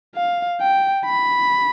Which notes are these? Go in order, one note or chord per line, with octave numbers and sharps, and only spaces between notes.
F5
G5
B5